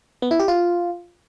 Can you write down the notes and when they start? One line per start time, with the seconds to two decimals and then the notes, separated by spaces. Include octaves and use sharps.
0.22 B3
0.31 E4
0.39 G4
0.48 F4